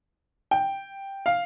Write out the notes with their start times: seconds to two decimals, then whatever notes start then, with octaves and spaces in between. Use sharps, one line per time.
0.51 G5
1.26 F5